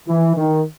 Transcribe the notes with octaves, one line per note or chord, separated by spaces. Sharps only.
E3
D#3